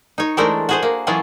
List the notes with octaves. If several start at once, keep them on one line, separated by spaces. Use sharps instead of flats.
D#4 C#5
E3 G#3 A3 D4 A#4 C5
F#4 G#4 C5
A#3
E3 F#3 C#4 F4 G#4 A4